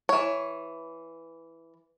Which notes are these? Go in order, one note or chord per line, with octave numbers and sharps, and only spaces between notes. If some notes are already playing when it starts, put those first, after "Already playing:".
E3 C#5